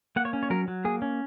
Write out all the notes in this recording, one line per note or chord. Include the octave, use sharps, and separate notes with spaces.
A#3 F#5
C#5
C#4
C#5
F#3 A#4
F#3
A#3 G#4
C#4